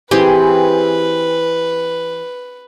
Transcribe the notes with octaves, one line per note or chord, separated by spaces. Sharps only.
E3 C4 G4 G#4 B4